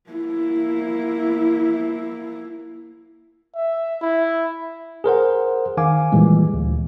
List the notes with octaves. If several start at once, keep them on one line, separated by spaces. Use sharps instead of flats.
A#3 E4
E5
E4
G#4 A#4 C5 F#5
D#3 F5 G#5 D6
A#2 E3 G3 G#3
D2